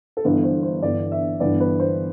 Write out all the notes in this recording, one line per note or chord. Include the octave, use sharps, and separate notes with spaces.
A4
G1 G2 E3 B3 B4
C5
C5
G1 G2 E3 B3 D5
E5
G1 G2 E3 B3 D5
B4
C5